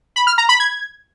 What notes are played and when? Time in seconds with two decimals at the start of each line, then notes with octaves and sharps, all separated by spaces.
0.16 B5
0.27 F6
0.38 A#5
0.49 B5
0.60 G#6